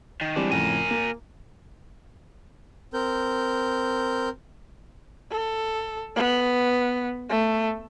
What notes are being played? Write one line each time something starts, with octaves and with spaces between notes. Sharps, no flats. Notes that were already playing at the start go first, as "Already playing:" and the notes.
D#3
E3 G3 G#3 C4 D4
F2 A2 C#3 A#4 G#5
A#3
C4 A#4 G6
A4
B3
A3